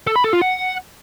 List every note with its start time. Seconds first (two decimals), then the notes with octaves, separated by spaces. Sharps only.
0.07 A4
0.16 B5
0.24 A4
0.33 F4
0.42 F#5